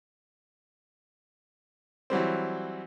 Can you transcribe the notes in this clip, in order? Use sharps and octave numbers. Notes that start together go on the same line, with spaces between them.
E3 F#3 G3 C4